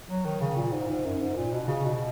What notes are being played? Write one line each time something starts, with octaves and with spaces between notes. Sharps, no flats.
F#3
D#3
C#3
A#2
G#2
G#2
F#2
G#2
A#2
B2
C#3
B2